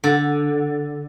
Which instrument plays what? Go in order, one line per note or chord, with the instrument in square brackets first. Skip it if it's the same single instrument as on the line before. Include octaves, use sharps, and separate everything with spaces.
[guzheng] D3